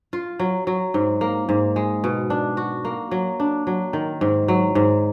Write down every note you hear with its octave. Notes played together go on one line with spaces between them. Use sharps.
F4
F#3
F#3
G#2
A#3
G#2
G#3
B2
D4
F#4
A#3
F#3
D4
F#3
D#3
G#2
F#3
G#2